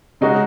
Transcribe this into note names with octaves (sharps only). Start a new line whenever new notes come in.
C#3 G#3 D#4 F#4